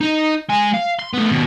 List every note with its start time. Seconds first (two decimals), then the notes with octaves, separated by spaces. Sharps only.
0.01 D#4 D#5
0.50 G#3 G#5
0.74 F5
0.99 C6
1.14 A3 B3
1.31 D#2 B2